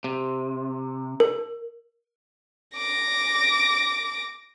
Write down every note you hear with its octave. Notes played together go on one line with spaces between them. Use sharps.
C3
A#4
D6 A#6